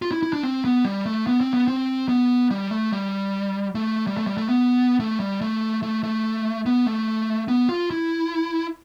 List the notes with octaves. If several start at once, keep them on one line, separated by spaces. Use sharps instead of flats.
F4
E4
E4
D4
C4
B3
G3
A3
B3
C4
B3
C4
B3
G3
A3
G3
A3
G3
A3
G3
A3
B3
A3
G3
A3
A3
A3
B3
A3
B3
F4
E4